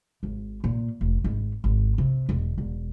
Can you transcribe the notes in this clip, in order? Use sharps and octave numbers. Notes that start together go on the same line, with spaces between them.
G#1
A#2
F1
G#1
G#1
C3
E1
E1